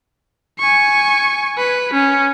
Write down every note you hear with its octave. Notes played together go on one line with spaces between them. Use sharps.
G#5 C#6
B4
C#4